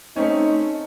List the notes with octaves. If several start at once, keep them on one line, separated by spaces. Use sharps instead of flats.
A3 C4 C#4 D#4